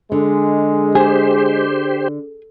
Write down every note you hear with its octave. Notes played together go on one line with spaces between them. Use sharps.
D3 G#3
G4 G#4 C5